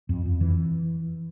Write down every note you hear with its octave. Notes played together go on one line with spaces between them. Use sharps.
F2
F2
E3